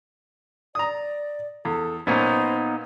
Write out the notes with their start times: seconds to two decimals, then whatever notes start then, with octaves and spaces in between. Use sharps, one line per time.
0.75 D5 A#5 D#6
1.65 E2 A4
2.07 A#2 A#3 B3 C#4 D#4 C5